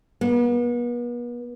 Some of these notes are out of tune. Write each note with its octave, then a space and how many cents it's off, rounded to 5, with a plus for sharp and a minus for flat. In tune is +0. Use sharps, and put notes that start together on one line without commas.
B3 -40